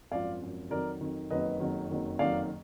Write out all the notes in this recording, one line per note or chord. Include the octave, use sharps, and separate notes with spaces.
G#1 F#2 F3 D5 F5
G#1 F#2 F3
F2 D#3 F#3 A#4 D5
F2 D#3 F#3
F#1 F2 D#3 F#3 B4 D#5
F#1 F2 D#3 F#3
F#1 F2 D#3 F#3
F#1 F2 D#3 F#3 D5 F5